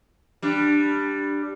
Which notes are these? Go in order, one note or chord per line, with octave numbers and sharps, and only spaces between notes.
G3 D4